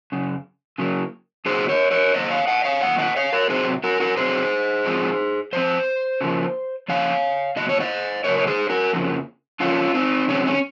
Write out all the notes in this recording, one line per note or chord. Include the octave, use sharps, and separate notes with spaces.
F#2 C#3
C#3 F#3 A#3
C#3 F#3 A#3 G#4 C5
A#4 C#5
A#4 C#5
F#2 D#3 A#3 C5 D#5
C#5 F5
D#5 F#5
C#5 F5
F#2 D#3 A#3 F#5
D#5 F#5
C#5 F5
A#4 C#5
C3 F#3 C4 G#4 C5
F#4 A#4
F#4 A#4
C3 F#3 C4 G#4 C5
G#2 F3 G#3 C4
G#2 F3 C4 C5
C#3 F3 A#3
C#3 F3 A#3 C#5 F5
C#3 F#3 A#3 D#5
C#5
C5 D#5
C#3 F#3 A#3 A#4 C#5
C#5
G#4 C5
F#4 A#4
F2 C#3 F3 A#3
F2 C#3 F3 A#3 C#4 F4
C4 D#4
F2 C3 D#3 G#3 C4 C#4
C#4